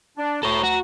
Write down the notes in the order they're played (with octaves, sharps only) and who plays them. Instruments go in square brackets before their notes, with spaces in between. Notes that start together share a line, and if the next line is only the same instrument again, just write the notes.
[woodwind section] D4
[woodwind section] D2 A#5 [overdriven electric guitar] A4 C#5
[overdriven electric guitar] F#4